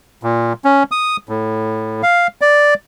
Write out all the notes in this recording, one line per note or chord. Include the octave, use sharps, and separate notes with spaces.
A#2
C#4
D#6
A2
F5
D5